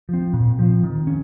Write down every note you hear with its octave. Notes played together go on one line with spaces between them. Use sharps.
F3 C4
A#2
F3 C4
D#3
C#4